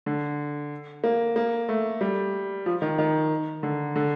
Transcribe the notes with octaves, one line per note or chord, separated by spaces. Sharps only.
D3
A#3
A#3
A3
G3
F3
D#3
D#3
D3
D3